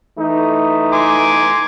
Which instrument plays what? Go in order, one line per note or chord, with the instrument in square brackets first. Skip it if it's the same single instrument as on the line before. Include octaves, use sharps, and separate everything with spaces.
[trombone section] E3 A3 D#4
[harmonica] G#5 C6 D6